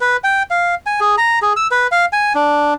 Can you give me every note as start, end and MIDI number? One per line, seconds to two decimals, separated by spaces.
0.01 0.17 71
0.24 0.43 79
0.50 0.75 77
0.86 1.00 80
1.00 1.16 68
1.18 1.39 82
1.42 1.53 68
1.56 1.67 88
1.71 1.87 71
1.92 2.06 77
2.13 2.33 80
2.35 2.74 62